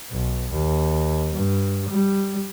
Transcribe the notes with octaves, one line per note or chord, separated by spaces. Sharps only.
B1
D#2
G2
G3